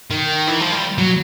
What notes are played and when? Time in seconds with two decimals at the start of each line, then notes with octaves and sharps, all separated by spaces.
0.11 D#3
0.47 E3
0.61 F3
0.72 G3
0.98 F#3